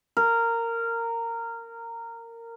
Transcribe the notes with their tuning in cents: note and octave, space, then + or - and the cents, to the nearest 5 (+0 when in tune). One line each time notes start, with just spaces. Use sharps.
A#4 -15